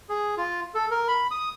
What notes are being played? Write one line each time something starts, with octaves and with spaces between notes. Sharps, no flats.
G#4
F4
A4
A#4
B5
D#6